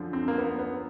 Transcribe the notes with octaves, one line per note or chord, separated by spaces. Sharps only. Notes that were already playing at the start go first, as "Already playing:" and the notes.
Already playing: F#2 D3 F3
C4
A#3
B3
B3